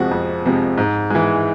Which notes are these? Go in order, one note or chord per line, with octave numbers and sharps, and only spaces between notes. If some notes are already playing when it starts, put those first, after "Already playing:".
Already playing: F2 C3 F3 G#3 F#4
F2
C3 F3 G#3
G#2
E3 G#3